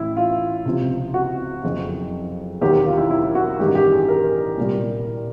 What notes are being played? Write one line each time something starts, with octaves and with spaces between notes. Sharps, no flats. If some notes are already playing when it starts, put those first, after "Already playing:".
Already playing: A1 A2 E3 E4
F4
C#2 C3 F3
F#4
F#1 F2 C#3
E1 D#2 D#3 F#3 G4
G4
F4
E4
E4
F#4
A1 G2 D#3 G4
G4
G#4
A#4
C2 A#2 G3